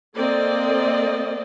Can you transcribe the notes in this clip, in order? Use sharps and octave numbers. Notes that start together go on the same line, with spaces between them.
A#3 C4 A4 D5 D#5